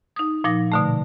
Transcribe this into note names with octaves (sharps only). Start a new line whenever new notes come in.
D#4 D#6
A#2 F3 D#4 A#6
B2 D3 A3